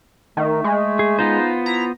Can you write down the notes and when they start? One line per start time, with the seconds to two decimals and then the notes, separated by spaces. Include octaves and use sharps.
0.37 D#3 A3
0.64 G#3
0.99 G#4
1.19 B3 D#4 F4 C5
1.66 E4 A#5